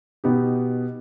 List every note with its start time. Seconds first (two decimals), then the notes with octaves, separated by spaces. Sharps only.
0.24 B2 B3 D#4 G4